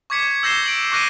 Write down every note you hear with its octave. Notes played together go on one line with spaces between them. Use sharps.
C#6 D6 G#6 B6 C#7
E6 G6 A#6 C7 E7 G7
D7 F#7
C#6 D6 F#6 A#6 D7 D#7